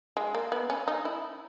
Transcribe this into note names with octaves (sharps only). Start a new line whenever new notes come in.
G#3
A#3
B3
C#4
D#4
E4